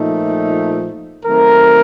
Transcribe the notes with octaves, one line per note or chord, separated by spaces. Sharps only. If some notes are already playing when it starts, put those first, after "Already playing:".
Already playing: A#2 F3 A3 D#4
D#3 F#3 A3 C4 A#4